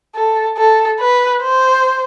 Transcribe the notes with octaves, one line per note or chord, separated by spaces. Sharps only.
A4
A4
B4
C5